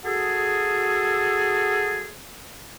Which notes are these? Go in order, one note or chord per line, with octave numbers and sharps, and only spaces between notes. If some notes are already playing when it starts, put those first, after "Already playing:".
F#4 G#4 A4